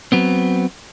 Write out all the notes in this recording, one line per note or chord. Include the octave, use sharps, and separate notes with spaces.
F#3 B3 C4